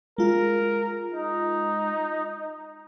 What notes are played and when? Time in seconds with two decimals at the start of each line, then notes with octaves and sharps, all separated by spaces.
0.18 G#3 F4 A#4
1.14 D#4